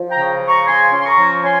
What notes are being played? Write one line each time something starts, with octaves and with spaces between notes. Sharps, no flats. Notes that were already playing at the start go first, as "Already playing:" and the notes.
Already playing: F3
G5 A#5
C#3
F3
A#5 C#6
C#3 G#5 C6
C#4
C6
A#5 C#6
F3
C#4 G#5 C6